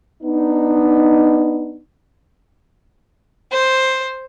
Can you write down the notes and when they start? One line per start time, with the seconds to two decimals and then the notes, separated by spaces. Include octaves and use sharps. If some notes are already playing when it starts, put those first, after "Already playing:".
0.22 B3 D4 D#4
3.52 C5